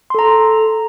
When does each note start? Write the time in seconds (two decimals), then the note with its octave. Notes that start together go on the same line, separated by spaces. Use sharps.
0.10 C6
0.15 A4
0.19 A#5